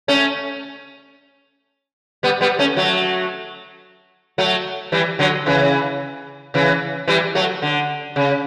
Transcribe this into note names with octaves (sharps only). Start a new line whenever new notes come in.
A3 C#4
G3 B3
G3 B3
A3 C#4
F#3 A3
F#3 A3
E3 G3
D3 F#3
C#3 E3
C#3 E3
E3 G3
F#3 A3
D3
C#3